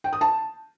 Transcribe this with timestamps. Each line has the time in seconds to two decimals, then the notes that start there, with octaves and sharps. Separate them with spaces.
0.04 G5
0.13 D#6
0.21 A5